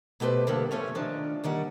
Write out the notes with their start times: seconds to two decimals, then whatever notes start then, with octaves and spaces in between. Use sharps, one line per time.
0.20 B2 A3 G4 B4 C5
0.47 D2 G2 D3 A#3 G4
0.71 F3 A3 C#4 C#5
0.95 D#3 F3 D4
1.44 D#2 D#3 G3 F#5